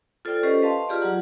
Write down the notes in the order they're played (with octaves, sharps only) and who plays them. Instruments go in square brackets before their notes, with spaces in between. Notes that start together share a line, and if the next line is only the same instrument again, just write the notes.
[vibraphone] F4 A4 C5 D5 G5
C#4 G4 A4 B4 C5 D#5
B4 D#5 F5 A5 C6
F4 G4 G#4 D5
F#3 F4 F#5 A#5